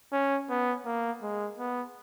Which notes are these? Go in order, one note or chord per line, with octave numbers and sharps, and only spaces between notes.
C#4
B3
A#3
G#3
B3